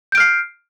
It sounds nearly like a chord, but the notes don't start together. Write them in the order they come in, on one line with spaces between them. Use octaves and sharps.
G6 D7 F6 C7